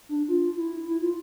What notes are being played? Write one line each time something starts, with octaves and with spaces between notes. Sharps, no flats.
D4
F4
E4
E4
F4